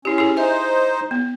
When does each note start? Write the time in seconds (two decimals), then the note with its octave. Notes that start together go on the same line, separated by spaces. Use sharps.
0.05 C#4 E4 G4
0.18 E4 G4 G#4
0.37 D#4 C5 E5 G#5
1.11 B3